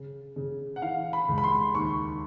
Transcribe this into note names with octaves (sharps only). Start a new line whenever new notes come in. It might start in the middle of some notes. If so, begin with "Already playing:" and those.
Already playing: C#3
C#3
F#5
E3 F5
B5
C#2
B5
C6
D#2 C#6